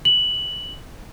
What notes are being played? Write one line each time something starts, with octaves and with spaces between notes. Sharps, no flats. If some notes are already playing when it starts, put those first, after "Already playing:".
F#7